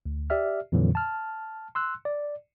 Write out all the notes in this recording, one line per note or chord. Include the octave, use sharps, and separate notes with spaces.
D2
G4 D5 E5 F6
F2 A#2 D3 E3 F#3
A5 F6
C6 E6 F#6
D5